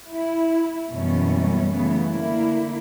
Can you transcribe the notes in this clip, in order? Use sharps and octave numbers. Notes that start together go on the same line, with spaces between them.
E4
F#2 B2 E3 G3 A#3 C#4
C#3 E3 G3 A3 B3
D3 A#3 E4